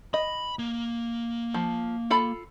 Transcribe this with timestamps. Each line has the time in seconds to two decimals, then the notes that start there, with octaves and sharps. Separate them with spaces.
0.14 D#5 B5
0.59 A#3
1.54 F3
2.10 F4 A4 B5